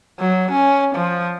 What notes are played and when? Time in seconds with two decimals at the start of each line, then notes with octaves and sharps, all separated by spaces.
0.20 F#3
0.52 C#4
0.96 F3